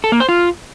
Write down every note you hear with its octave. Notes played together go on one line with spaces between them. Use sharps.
A4
A#3
C5
F4